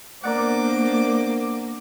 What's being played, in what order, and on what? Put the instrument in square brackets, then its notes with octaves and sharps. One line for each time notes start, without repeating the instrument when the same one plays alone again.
[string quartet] A#3 [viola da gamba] B3 D4 C5 [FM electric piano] A#4 D5 F#5 [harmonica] D6